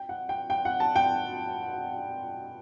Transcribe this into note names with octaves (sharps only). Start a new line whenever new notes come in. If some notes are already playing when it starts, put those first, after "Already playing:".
Already playing: G5
F#5
G5
G5
F#5
A5
G5